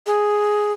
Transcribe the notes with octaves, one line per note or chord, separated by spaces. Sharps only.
G#4